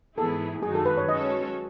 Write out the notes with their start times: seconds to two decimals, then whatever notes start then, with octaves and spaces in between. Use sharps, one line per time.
0.17 G#2 E3 B3 E4 G#4 A4
0.63 F#2 D#3 G#3 D#4 F#4 G#4
0.75 A4
0.85 B4
0.97 C#5
1.08 G#3 C#4 F#4 A4 C#5 D#5